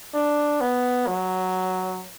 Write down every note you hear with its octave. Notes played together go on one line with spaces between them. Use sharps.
D4
B3
F#3